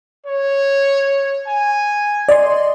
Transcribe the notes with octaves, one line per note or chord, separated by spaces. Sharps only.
C#5
G#5
D5 D#5 C6